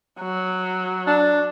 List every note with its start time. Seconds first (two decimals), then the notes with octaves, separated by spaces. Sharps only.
0.20 F#3
1.07 D4